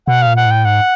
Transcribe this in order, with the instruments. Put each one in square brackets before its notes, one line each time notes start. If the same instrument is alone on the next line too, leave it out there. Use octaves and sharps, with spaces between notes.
[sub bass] B2 [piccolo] F#5
[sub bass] A#2 [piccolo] F5
[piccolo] F#5
[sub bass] A2
[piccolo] G5
[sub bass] G#2 [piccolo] F#5